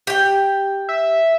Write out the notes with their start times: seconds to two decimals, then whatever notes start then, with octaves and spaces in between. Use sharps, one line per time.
0.07 G4 G5
0.89 E5